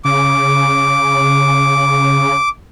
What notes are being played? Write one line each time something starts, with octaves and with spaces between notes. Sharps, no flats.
C#3 D6